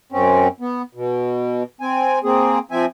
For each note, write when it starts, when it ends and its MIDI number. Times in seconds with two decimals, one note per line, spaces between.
0.12 0.48 42
0.12 0.48 60
0.12 0.48 61
0.60 0.82 59
0.95 1.63 47
1.81 2.19 60
1.81 2.19 80
2.24 2.59 58
2.24 2.59 60
2.24 2.59 68
2.71 2.85 53
2.71 2.85 60
2.71 2.85 76
2.71 2.85 80